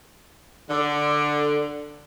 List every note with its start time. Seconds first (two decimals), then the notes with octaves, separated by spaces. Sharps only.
0.70 D3